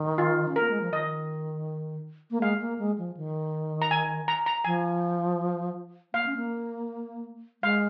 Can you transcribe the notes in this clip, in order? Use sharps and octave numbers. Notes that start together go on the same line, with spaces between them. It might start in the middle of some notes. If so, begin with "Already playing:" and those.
Already playing: D#3
F4
C#4
A#3 A#4
G#3
F3
D#3 D#5
A#3
G#3 F5
A#3
G#3
F3
D#3
A#5
G#5
A#5
A#5
F3 G#5
A#3 F5
C#4
A#3
G#3 F5